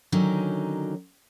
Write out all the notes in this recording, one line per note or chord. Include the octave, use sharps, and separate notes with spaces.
D3 D#3 F#3 C#4 D#4